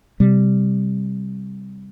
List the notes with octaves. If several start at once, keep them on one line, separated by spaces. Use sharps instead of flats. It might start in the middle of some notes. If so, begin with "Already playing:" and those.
C3 G3